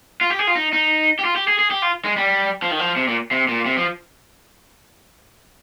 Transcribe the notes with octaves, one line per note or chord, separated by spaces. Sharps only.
F4
G4
G#4
F4
D#4
D#4
G4
F4
G4
G#4
G#4
G4
F4
G#3
G3
F3
D#3
F3
C3
A#2
C3
A#2
C3
F3